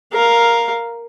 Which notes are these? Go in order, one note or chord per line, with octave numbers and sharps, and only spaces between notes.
A#4 F5